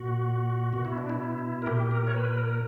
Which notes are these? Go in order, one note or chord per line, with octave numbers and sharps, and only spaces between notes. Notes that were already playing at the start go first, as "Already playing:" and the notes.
Already playing: A#2 F#4
B2 F#4
E4
D4
E4
A#4
A#2 G4
A#4
C#5
B4
A#4